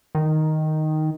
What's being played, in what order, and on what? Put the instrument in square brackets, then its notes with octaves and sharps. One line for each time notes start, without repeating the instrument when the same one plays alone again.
[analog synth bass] D#3